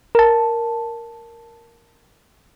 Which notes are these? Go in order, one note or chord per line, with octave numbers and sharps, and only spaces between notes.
A#4 A5